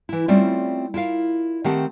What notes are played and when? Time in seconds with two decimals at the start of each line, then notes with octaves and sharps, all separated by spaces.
0.09 E3 E4
0.28 G3 A3 C4 C#4 E4 F4
0.94 E4 F4 A#4 F5
1.64 D#3 A3 C4 G4 F#5 A5